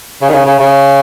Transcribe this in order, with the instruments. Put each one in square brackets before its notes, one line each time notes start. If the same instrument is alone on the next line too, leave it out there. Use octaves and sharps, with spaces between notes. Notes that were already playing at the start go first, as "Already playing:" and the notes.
[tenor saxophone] C#3
D#3
C#3
C#3
C#3